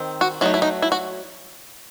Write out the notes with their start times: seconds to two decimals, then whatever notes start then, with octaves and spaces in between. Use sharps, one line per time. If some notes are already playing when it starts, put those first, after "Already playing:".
Already playing: D#3 C4
0.21 F#4
0.41 F#3 A3 D#4 E4
0.54 E4
0.62 D#4
0.82 E4
0.92 F#4